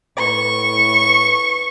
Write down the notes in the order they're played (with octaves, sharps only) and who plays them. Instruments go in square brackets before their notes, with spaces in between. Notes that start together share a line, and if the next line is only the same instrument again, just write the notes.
[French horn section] A2 B4 [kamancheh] C#6